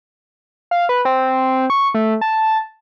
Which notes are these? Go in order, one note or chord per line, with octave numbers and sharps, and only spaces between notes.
F5
B4
C4
C#6
A3
A5